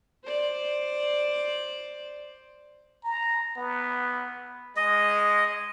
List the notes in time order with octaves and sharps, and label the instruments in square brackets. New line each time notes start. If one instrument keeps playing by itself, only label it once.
[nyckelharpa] C5 D5
[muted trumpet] A#5
B3
[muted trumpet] G#3 [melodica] D#5